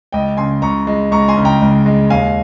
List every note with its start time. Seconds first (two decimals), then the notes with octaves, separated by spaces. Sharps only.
0.12 C#2 D#5 G5
0.37 C#3 G#5 C6
0.62 C#2 A#5 C#6
0.87 G#3
1.11 C#2 A#5 C#6
1.22 A#5
1.28 G#5 C6
1.37 C#3
1.45 G5 A#5
1.62 C#2
1.86 G#3
2.10 D#2 F5 G#5